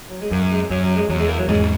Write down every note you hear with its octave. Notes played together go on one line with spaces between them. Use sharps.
F#3
G#3
F#2 A#3
G#3
F#2 F#3
F#3
G#3
E2 F#3
G#3
A#3
F#3
E2 G#2 G#3